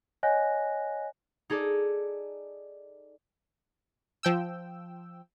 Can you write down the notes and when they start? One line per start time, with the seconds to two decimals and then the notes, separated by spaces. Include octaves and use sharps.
0.23 C#5 D#5 F#5 G#5 F#6 A#6
1.50 D#4 G#4 A4 D5
4.23 F3 G5 E6